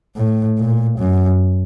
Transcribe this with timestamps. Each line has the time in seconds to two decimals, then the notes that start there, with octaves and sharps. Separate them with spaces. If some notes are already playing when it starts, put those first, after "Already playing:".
0.17 A2
0.58 A#2
0.99 F#2